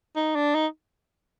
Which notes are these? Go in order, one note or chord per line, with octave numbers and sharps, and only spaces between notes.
D#4
D4
D#4